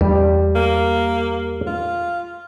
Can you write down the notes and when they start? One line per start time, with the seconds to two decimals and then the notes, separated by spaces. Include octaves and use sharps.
0.01 E2 G3
0.55 A#3
1.67 F4